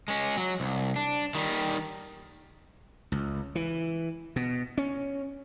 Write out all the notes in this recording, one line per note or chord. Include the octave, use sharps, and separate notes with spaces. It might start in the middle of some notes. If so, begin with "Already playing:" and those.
G#3 C#4
F#3
C2
D4
D#3 G3
C#2
E3
B2
C#4